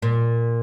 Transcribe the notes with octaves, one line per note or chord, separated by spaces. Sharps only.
A#2